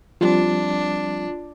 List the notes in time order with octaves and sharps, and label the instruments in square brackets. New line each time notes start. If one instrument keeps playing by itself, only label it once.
[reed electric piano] F3 G3 C4 [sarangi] D4 [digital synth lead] F4